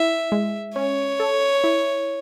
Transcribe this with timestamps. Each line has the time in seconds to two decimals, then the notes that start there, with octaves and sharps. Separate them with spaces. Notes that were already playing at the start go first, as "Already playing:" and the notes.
Already playing: E4 E5
0.32 G#3
0.76 C#4 C#5
1.20 A4
1.64 E4